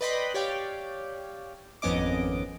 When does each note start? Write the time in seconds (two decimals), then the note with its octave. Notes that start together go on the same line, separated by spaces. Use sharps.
0.01 B4 D5 D#5 G5 B5 C6
0.34 G4 C#5 D5 F5 G5
1.82 G#1 F2 B3 C#4 D#5 D6